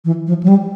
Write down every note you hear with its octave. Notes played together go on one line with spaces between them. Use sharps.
E3
F3
F#3
G3